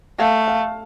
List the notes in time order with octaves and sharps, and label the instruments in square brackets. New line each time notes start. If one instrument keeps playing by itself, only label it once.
[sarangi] A3 [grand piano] F5
[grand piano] F5